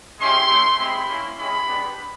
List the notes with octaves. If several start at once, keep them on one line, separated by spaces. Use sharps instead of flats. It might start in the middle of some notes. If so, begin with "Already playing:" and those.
G#3 C#4 E4 G4 C6
A3 C#4 E4
G#3 C4 E4 G4 B5
A#3 C#4 E4
G#3 C#4 E4 G4 B5
G#3 B3 D4 G4